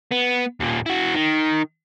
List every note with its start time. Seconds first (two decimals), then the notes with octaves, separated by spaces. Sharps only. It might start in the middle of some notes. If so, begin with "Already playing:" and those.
0.11 B3
0.60 D#2 A#2
0.86 E4 F#4
1.15 D#3